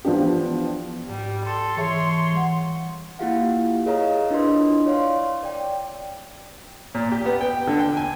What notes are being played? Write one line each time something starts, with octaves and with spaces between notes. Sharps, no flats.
E3 F3 B3 D4 G4
G#2 G3
A4 C6
E3 G#4 C#5 E5 A5
G3 F#5
A#3 E4 F4 G4 F5 F#5
G#4 A#4 C#5 D#5 F5 A#5
D4 E4 F4 B4 D#5 C6
C#5 D5 F5 C6
D5 G5
A#2
G4
B3
G5
D3
G5
G#5